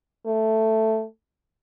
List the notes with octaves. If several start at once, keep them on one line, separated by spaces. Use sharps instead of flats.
A3